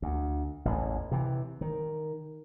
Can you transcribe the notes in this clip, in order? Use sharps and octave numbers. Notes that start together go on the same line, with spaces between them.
D2
A1 E2
C3 E3
D#3